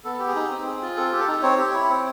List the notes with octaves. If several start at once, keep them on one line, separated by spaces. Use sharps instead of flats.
B3 A4
G4
G#4
D#4
C4
G#4
F4
C4 A4
G4
A4
D#4
C4 C#5
G4
E4
C4